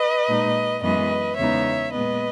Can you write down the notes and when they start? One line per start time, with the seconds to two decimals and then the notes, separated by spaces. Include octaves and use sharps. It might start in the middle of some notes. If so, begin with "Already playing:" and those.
Already playing: B4 D#5
0.28 A#2 G#3 D#4
0.82 F#2 E3 G#3 B3 B4 D#5
1.38 E2 C#3 G#3 B3 D#4 C#5 E5
1.93 A#2 G#3 B3 B4 D#5